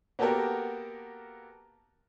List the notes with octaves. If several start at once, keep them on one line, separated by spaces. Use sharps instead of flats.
A#3 B3 F#4 G4 A4 A#4